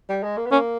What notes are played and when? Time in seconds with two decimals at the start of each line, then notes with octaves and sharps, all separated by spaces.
0.09 G3
0.23 G#3
0.37 A#3
0.46 B3
0.51 A#3 C#4